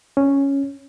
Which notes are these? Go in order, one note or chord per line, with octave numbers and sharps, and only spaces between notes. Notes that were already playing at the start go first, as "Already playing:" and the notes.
C#4